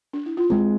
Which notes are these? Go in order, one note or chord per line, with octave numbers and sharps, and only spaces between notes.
D4
E4
F4
G#3 C4 G#4